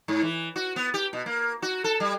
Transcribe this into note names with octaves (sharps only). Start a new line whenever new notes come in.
G#2
E3
F#4
B3
G4
B2
A#3
F#4
A4
G3